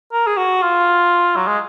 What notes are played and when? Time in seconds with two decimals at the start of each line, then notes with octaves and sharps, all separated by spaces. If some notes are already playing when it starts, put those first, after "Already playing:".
0.13 A#4
0.27 G#4
0.37 F#4
0.62 F4
1.36 F#3
1.47 G#3